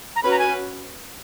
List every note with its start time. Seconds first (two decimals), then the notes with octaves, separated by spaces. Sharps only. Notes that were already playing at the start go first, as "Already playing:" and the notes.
0.16 A#5
0.23 C#4 F#4 B4 B5
0.31 A#5
0.39 G#5